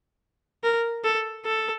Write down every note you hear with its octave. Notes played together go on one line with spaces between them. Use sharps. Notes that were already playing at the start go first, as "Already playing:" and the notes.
A#4
A4
A4